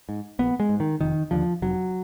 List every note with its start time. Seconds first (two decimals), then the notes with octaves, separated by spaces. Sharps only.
0.09 G#2
0.39 A#1 B3
0.60 G#3
0.69 G#2
0.80 D#3
1.01 F1 D#3
1.31 D#2 D3 F3
1.62 F1 F#3